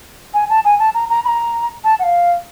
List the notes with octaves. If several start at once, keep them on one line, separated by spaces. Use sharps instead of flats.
G#5
A5
G#5
A5
A#5
A#5
B5
A#5
A5
F#5
F5